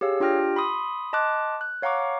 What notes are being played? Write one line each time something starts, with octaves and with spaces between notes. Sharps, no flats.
G4 G#4 C#5 F5 E6
D4 F4 G4 G5 F6 A#6
B5 C6 D#6
D#5 A5 C6 D6 F#6
F#6
C#5 F5 F#5 A#5 C#6 D6